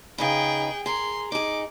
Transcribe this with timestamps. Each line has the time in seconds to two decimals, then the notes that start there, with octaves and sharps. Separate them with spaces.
0.18 C#3 D#4 G#4 B4 G5
0.86 G#4 A#4 C6
1.32 D#4 G#4 D6